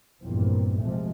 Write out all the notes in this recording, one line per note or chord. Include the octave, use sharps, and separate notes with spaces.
A#1 E2 G2 A#2 A#3 C4
C3 F3 G#3 A3